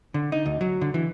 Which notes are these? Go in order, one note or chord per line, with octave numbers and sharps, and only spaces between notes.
D3
D#4
D2
F#3
D3
E3